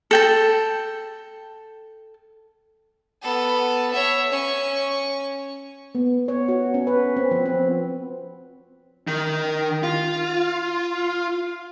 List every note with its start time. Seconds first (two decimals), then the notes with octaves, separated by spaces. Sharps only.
0.11 A4 G5 A5
3.22 B3 A4
3.93 C#5 E5
4.32 C#4 C#6
5.95 B3
6.28 C#5
6.49 F#4
6.74 C#4
6.87 B4
7.16 C4
7.31 F3
7.46 C4
9.07 D#3
9.83 F4